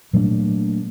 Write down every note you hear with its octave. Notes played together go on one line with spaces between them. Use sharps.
A#2 F#3 A3 D4